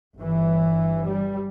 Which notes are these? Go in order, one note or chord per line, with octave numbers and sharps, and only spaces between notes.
G1 G2 E3
G3